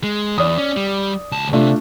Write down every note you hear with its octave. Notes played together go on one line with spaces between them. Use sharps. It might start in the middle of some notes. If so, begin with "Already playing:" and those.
G#3
E2 D5 D#6
C#4
G3
C#2 A5
C3 A3 D4 F4